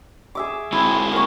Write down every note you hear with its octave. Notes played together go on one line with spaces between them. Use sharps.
G#4 E5 D6
G#3 C4 E4 F#4
A#3 C#6